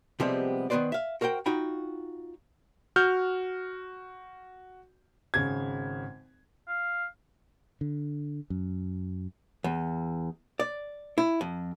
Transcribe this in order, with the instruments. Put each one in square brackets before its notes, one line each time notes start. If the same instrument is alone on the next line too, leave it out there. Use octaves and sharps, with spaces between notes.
[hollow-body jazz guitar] C3 F3 G3 G#3 B3 C4
D#3 B3 C4 B4 C5 D5
E5 F5
F#4 A#4 C5 F#5 G5
D#4 F4 F#4 G5 B5
[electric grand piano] F#4 F6 G6
[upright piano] G#1 C#3 G#6
[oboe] F5
[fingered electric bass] D3
F#2
[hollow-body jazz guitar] E2
D5
E4
F2